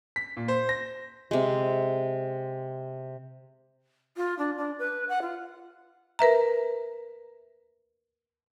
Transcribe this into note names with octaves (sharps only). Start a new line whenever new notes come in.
B6
A#2
C5
A#6
C3 G#3
F4
D4
D4
B4
F#5
F4
A#4 B4 E5 A#5